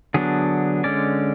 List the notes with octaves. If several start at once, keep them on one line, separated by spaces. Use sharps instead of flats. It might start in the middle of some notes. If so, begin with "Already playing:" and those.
D3 F#3 B3 D4 G#4
D3 G#3 C#4 D5